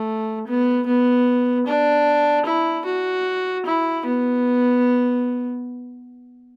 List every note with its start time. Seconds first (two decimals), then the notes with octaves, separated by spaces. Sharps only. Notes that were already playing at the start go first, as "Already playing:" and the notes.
Already playing: A3
0.47 B3
0.86 B3
1.67 D4
2.46 E4
2.85 F#4
3.66 E4
4.05 B3